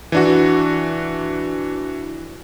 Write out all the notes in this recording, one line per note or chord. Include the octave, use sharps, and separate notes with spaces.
E3 D4 F#4